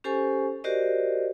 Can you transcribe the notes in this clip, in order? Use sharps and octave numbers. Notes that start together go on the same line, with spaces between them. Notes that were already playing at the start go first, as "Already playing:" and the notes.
C#4 G4 A4 C5 G#5 C#6
F#4 G4 A#4 C5 D5 D#5